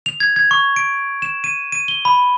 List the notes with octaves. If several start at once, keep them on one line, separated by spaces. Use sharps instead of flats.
F7
G#6
G#6
C#6
D7
E7
D#7
D#7
G7
B5